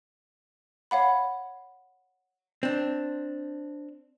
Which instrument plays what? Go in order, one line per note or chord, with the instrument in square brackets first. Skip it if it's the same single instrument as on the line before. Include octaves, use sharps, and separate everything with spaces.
[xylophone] C#5 F5 F#5 B5
[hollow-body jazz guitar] C4 D4